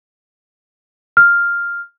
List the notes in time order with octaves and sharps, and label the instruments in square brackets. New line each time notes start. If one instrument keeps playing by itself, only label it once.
[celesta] F6